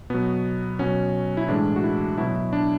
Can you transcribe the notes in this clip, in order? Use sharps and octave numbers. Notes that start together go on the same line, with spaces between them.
B2 F#3 B3
B2 F#3 C#4
E4
A2 E3 G#3 D4
F#4
E4
B2 F#3 E4
E4
D4